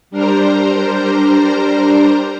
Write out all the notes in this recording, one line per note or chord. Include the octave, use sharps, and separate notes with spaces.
G3 D4 A#4 C5 A#5